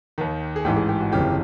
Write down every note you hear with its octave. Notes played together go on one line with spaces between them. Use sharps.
D#2 D#3
G#4
A1 G#2 E3 G4
G#4
G4
F#4
G1 F2 C#3 E3 G4